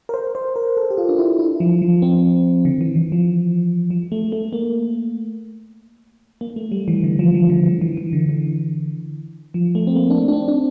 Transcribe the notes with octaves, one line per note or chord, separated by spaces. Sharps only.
A#4
C5
C5
A#4
A4
G4
F4
D4
E4
E4
F3
F3
C4
D3
E3
E3
F3
F3
A3
A3
A#3
A#3
A3
G3
E3
D3
F3
F3
D3
D3
E3
E3
D3
E3
F3
A3
C4
A#3
D4
C4
D4
C4
D4